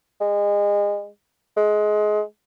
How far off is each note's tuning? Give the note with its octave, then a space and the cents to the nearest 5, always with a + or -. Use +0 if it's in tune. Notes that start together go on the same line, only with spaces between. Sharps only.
G#3 -30
G#3 +20